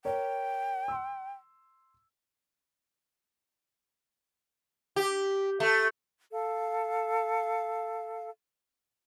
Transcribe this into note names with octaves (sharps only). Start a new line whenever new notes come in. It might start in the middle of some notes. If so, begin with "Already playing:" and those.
A#4 C#5 G5
C6 E6
G4
A3
A4 F5